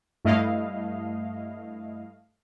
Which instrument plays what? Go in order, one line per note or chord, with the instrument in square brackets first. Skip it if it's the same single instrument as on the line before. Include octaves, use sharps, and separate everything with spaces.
[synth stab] G2 A3 E4 D#5 F5